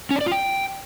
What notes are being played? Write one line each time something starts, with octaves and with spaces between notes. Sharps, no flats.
C#4
D4
D5
F4
G5